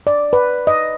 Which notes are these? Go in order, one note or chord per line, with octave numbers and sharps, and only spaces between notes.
D5
B4
D#5